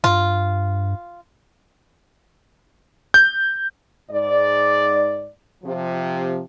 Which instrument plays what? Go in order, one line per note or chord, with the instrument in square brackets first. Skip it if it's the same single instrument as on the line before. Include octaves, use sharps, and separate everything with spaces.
[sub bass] G2 [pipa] F4
[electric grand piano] G6
[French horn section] G#2 D5
C3 F3